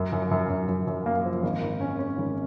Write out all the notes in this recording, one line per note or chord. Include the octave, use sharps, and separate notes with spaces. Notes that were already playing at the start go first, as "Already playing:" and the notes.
Already playing: F#2
F#2
F#2
F#2
F#2
F#2
A#3
F3
G#1
G#1
C#4
C#4
G#1